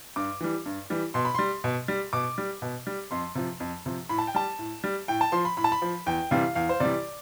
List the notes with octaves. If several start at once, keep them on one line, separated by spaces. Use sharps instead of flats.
G2 D6
E3 G3
G2
E3 G3
B2 C6
B5
G3 C6
B2
G3
B2 D6
G3
B2
G3
F2 C6
C3 F3
F2
C3 F3
A2 B5
A5
G5
G3 A5
A2
G3
A2 G5
A5
F3 C6
B5
A2 B5
A5
B5
F3
E2 G5
C3 E3 G3 F5
E2 F5
C5
C3 E3 G3 D5